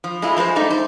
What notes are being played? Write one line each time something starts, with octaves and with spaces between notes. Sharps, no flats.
F3
G#3 A3 E4 F4
F3 G#3 A#4 C5
G3 A3 D#4
C5